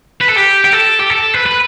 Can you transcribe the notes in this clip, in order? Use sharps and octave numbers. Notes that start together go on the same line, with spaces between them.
B4
A4
G4
G4
A4
G4
A4
B4
B4